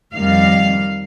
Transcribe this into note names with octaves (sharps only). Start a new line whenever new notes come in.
F2 D#3 G3 F5